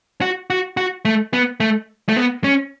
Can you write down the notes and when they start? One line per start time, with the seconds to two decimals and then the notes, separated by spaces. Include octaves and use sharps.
0.21 F#4
0.50 F#4
0.77 F#4
1.05 A3
1.33 B3
1.60 A3
2.09 A3
2.17 B3
2.44 C#4